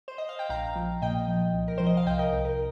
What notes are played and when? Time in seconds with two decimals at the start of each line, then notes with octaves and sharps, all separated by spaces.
0.08 C5
0.18 D#5
0.29 F5
0.39 G5
0.49 A#1 F5 A#5
0.76 F3
1.02 A#2 D#5 G5
1.28 F3
1.54 C2
1.68 A#4
1.78 F3 C5
1.86 D#5
1.97 F5
2.07 C2 D#5 G5
2.19 A#4 D#5
2.32 C2
2.45 A#4